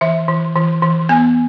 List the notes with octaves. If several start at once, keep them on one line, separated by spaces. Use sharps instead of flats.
E3 E5
E3
E3
E3
B3 G#5